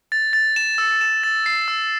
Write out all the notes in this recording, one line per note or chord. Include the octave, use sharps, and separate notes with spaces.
A6
A6
E7
E6
E7
A6
C7
E6